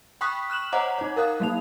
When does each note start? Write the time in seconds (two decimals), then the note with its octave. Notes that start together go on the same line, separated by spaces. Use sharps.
0.21 G5 B5 C#6 D#6 F#6 B6
0.50 F6 F#6 E7 F#7
0.72 C5 C#5 D#5 F#5 A#5 D6
0.99 D#4 C#5
1.16 A#4 F5 D#6 F#6
1.40 F#3 A#3 F7